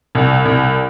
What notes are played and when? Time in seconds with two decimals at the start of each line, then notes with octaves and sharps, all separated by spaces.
0.15 C2
0.45 C2